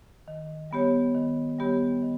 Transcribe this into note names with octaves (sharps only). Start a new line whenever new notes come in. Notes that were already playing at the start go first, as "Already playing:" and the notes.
D#3
G3 B3 G4 C#5
D#3
G3 B3 G4 C#5
D#3